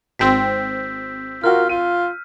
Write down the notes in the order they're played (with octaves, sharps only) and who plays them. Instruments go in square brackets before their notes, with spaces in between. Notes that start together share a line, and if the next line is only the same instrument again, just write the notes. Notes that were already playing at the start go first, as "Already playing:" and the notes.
[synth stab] G#1 C4 [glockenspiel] E6 G6 B6
[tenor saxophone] F4 [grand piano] F#4 A#4 [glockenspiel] F6
[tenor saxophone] F4 [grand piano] D#7